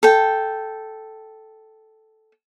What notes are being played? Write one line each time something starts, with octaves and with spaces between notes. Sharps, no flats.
A4 G5